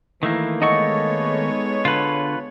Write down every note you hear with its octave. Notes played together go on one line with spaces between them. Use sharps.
D#3 E3 A3 A#3
G#3 B3 D#4 A4 C#5 D#5 F#5 C#6
D3 F4 B4